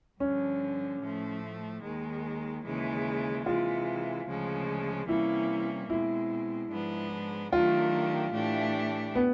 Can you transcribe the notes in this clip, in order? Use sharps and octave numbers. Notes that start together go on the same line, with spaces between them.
G2 D3 F3 C#4
A2 F3 A3
D#2 D#3 G#3
D#2 C#3 E3 G#3
C3 E3 G#3 F4
D2 C#3 F3 G#3
C3 E3 G3 A#3 C#4 E4
B2 G#3 C4 E4
G#2 F3 G#3 B3 D4
D#3 F#3 A3 D4 F4 G4
A2 E3 A3 D4 G4
B3